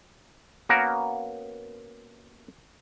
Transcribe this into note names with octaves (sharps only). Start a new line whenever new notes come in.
A#3 B3 C#4 F#4 A#4